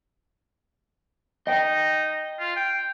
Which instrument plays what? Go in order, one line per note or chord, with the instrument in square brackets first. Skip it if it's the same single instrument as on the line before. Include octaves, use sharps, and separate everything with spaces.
[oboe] D#4 [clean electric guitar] D#5 G5
[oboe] F4
G5